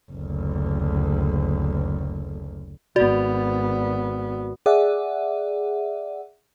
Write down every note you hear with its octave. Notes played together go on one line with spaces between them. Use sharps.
F#1 D2
G#1 B3 F#4 D5
G#4 D5 E5 F#5